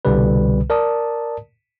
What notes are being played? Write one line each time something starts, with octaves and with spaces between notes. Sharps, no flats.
C2 B2 D3 G3 B4
A#4 D5 A5 D#6